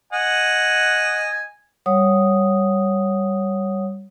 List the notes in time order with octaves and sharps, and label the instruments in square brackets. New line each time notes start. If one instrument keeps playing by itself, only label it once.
[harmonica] D#5 F#5 G#5
[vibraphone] G3 C#5 F#5 D#6